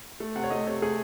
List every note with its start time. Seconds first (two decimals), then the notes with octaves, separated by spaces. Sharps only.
0.20 A3
0.35 C3 F#5
0.44 C#5
0.50 A3 D#5
0.67 C3 C#5
0.82 A3 G#4